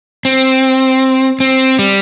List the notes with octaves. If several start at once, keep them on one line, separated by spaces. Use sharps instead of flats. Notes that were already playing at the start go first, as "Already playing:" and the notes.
C4
C4
G3